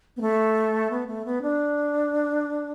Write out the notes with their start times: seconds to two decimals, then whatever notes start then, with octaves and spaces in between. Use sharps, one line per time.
0.17 B3
0.21 A3
0.91 B3
1.07 A3
1.25 B3
1.42 D4